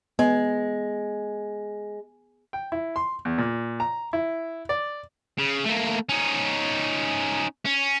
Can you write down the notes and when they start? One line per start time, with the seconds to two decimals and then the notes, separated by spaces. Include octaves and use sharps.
0.19 G#3 B3
2.53 G5
2.72 E4
2.96 C6
3.25 E2
3.38 A#2
3.80 A#5
4.13 E4
4.69 D5
5.39 C#3
5.65 A3 A#3
6.09 C#4 D#4
7.65 C#4